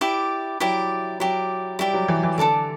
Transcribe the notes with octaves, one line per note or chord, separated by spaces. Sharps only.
E4 G4 D5
F#3 E4 G4 D5
F#3 E4 G4 D5
G3 E4 G4 D5
F#3
E3
E3
D3 A4 D5 A5 D6